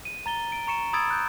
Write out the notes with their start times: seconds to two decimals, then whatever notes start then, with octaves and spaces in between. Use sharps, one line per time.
0.05 D#7
0.26 A#5 A6 G7
0.52 D7
0.67 A#5 C#6 C#7 E7
0.93 B5 D#6 E6 G#6 A6 D7
1.10 F#6 G6